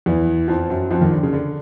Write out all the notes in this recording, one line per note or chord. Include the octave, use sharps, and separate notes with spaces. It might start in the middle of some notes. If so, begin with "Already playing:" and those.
E2 E3
F2 F3
F#2 F#3
F2 F3
D#2 D#3
D3
C#3
D3